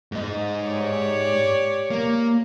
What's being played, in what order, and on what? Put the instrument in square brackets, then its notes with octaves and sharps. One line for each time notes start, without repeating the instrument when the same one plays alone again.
[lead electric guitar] G#2 D#5
[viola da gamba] G4 C#5 D5
[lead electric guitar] A#3